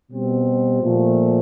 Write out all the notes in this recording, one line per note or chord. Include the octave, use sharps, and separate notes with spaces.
B2 G3 C4
A#2 F3 A3